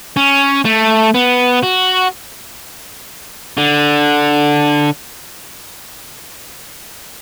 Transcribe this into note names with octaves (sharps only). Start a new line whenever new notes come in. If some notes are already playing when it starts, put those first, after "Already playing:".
C#4
A3
B3
F#4
D3